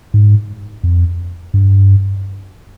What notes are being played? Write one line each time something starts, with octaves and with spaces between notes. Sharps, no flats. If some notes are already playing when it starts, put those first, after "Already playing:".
G#2
F2
G2